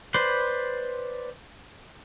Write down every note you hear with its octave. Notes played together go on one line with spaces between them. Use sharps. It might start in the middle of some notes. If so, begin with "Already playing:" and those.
B4 C5 D5 B5 C6